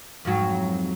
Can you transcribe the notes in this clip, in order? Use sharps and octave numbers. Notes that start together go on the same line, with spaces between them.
F2 G#2 F#3